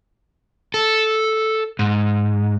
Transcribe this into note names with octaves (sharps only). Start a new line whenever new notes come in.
A4
G#2